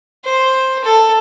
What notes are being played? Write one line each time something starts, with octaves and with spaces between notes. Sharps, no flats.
C5
A4